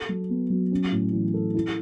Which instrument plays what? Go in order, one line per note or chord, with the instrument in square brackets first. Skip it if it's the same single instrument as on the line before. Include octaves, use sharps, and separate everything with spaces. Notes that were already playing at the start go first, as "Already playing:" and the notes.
Already playing: [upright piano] A4
F#3
B3
F#3
C#4
A2
E3
A4
E4